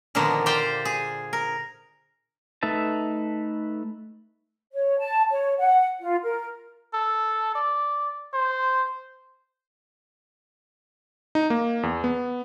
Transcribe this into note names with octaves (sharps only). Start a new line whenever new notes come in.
A#2 D3 D#3 F3 A#3 B3
G4 C5 D5 F5 G5
G#4
A#4
A3 D#4 B4 E5 A5
C#5
A5
C#5
F#5
F4
A#4
A4
D5
C5
D#4
A#3
E2
B3